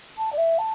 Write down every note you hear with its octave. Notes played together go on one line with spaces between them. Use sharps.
A5
D5
E5
A5